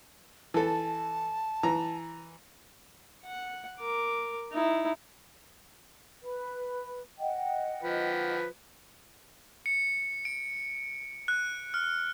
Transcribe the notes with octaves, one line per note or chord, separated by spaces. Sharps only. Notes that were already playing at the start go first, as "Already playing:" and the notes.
E3 A4 A5
E3 A#5
F#5
A#4 D6
D#4 E4
B4 B5
D#5 F#5 G5
F3 B4
C#7
D7
F#6
F6